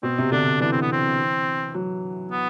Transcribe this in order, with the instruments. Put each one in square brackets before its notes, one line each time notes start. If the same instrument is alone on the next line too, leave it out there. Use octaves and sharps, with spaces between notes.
[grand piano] B2 [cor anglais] C4
[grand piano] C3
[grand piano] D3 [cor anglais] D4
[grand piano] E3 [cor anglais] D4
[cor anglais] C4
B3
C4
[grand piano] F#3
[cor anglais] B3